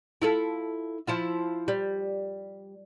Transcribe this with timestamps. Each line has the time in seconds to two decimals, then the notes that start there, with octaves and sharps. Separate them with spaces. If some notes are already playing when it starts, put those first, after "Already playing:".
0.22 E4 F4 A4
1.07 F3 E4 F4
1.68 G3